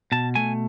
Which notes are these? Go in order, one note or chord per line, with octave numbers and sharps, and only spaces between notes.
B2 A5
A3 G#5